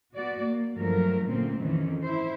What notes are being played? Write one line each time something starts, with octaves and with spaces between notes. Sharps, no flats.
B3 F#4 D5
A#3
G2 F3 F#3 A3 A#4
D2 A#2 A#3 C4 C#4
F2 D#3 E3 C#4
E4 C5